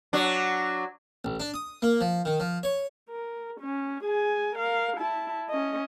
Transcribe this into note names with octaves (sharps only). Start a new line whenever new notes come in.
F#3 D4
A1
D4
D#6
A#3
F3
D#3
F3
C#5
A#4
C#4
G#4 G#5
A#4 F5
E4 A5
C#4 D#5